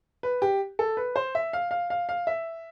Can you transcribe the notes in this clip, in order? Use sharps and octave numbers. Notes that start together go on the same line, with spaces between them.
B4
G4
A4
B4
C5
E5
F5
F5
F5
F5
E5